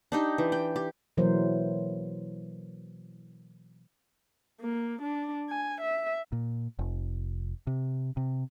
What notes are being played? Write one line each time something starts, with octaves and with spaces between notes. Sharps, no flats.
D4 D#4 G4
E3
G5
G4
B2 E3 F#3 A#3 A#4 C5
A#3
D4
G#5
E5
A#2
F1
C3
C3